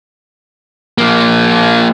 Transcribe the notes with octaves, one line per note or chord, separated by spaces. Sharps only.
F3 A#3